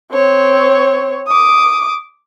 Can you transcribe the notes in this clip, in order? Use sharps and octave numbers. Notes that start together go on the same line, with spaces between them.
C4 C#5
D6 D#6